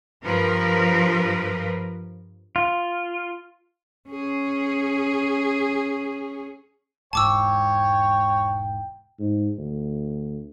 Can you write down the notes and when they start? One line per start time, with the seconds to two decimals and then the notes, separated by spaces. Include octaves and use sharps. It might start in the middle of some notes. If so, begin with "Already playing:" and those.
0.24 G2 F3 A#4 B4
2.56 F4
4.09 C#4 G#4
7.13 E1 G#2 E3 C#5 G5 A5 D6 E6
9.19 G#2
9.58 D2